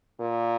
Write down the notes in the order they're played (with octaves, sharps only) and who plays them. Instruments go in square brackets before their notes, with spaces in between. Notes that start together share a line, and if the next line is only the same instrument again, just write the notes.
[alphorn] A#2